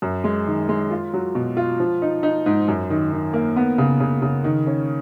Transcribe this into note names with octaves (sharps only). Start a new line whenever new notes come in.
F#2
G#3
D#3
G#3
F4
F#3
B2
F4
F3
D#4
D#4
G#2
F#2
D#3
D#3
A#3
B3
C#3
C#3
C#3
D#3
C#4